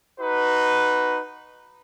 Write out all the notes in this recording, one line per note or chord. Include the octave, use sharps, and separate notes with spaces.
D#4 F#4 B4